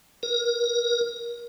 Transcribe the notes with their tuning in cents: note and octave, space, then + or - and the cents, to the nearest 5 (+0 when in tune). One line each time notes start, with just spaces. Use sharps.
A#4 +30